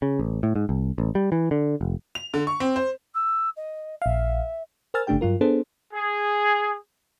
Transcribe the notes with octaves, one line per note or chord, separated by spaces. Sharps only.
C#3
A1
A2
G#2
C2
A1
G3
E3
D3
F1
F7
D3
C#6
C4
C5
E6
D#5
A#1 E5 F5
A#4 C5 G#5 E6 F6 A6
G1 C#3 A3 D4 G4 G5
G2 F#3 F4 A#4
B3 D4 G#4 A4 C5
G#4